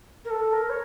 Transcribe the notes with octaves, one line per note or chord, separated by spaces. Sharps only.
A#4
A4
A#4
C#5